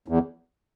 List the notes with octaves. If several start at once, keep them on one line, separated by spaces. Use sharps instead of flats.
E2